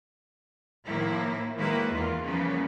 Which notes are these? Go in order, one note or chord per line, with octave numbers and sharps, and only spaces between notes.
A2 D#3 F3 A#3 E4
D#3 F#3 G#3 A#3 E4 B4
E2 D#3 F4
C#3 E3 F3 G3 A#3 B3